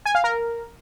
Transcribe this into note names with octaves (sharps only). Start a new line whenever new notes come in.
G#5
F5
A#4